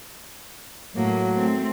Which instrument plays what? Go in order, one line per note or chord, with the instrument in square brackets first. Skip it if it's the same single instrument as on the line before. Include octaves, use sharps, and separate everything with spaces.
[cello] A2 A#3 [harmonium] F#3
[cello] A3 C4